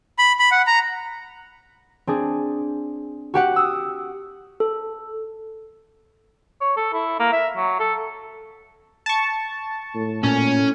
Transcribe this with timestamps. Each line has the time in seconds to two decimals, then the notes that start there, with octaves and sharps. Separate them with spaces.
0.18 B5
0.39 B5
0.51 F#5
0.67 A#5
2.07 C4 D4 G#4
3.34 F#4 G4 F#5
3.56 D#6 E6
4.60 A4
6.61 C#5
6.77 A4
6.93 E4
7.20 A#3
7.33 E5
7.57 F#3
7.80 A4
9.06 A5 C#6
9.95 A2
10.24 A#2 C#4